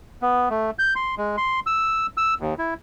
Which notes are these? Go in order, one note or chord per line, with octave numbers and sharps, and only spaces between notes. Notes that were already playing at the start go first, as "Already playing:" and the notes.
B3
A3
G6
C6
G#3
C6
E6
E6
D#2
E4